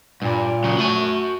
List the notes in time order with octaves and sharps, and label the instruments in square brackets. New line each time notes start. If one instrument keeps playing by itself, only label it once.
[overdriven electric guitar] G2 [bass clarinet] A#2
[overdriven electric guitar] C#3 F#3
[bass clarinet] A3 [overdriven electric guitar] F#4 G#5